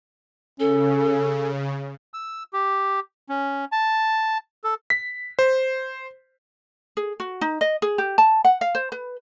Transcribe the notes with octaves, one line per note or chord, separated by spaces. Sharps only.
C#3 C#4 A4
E6
G4
C#4
A5
A4
B6
C5
G#4
F#4
D#4
D#5
G#4
G4
A5
F#5
F5
C5
B4